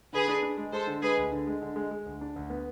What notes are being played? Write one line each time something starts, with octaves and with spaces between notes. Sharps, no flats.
D3 G#4 B4
D4
D4
G#3
G#3 A4 C5
D3
G#3 G#4 B4
D2
D3
G#3
D3
G#3
G#3
D2
D4
D2
B3